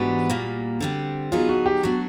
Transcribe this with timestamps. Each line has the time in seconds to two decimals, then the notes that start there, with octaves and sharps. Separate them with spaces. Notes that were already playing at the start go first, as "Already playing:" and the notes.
Already playing: G#2 E3 G3 B3 D4 F#4
0.30 A#2 G3 A#3
0.81 D3 G3 C4
1.32 D3 F#3 B3 D#4 F4 G#4
1.49 F#4
1.66 G4
1.83 B2 F#3 A3 D4 F#4